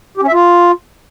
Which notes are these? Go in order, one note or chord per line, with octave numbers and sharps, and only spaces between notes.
G4
C#4
E5
F4